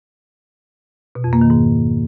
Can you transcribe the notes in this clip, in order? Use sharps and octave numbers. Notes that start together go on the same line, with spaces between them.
B2
F2
A#3
D#3
G#2